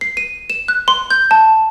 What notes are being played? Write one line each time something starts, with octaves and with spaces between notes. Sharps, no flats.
C7
D#7
E7
F#6
C6
G6
A5